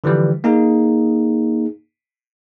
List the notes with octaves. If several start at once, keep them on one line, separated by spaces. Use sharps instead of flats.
D3 E3 F3 G3
A#3 D#4 G#4